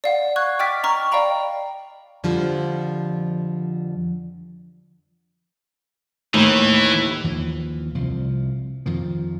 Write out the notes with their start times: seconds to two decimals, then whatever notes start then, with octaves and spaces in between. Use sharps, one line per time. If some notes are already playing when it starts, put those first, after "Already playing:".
0.04 D5 F5 F#5
0.36 C#6 F#6 G#6
0.59 D#5 G5 D6 F6 A6 B6
0.84 A#5 C#6 F6
1.12 D5 D#5 F5 G5 A#5 B5
2.24 F2 D3 F3 G3
6.34 D#2 A2 E3
7.24 D#2 E3 F3
7.95 C2 F3
8.86 F2 D#3 F3